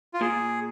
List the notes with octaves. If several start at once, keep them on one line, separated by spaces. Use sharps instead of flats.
F4
A#2 G#4